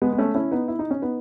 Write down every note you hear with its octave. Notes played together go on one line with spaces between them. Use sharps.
G#3 B3
B3
A3 C#4
C#4 E4
B3 D#4
E4
D#4
C#4
B3 D#4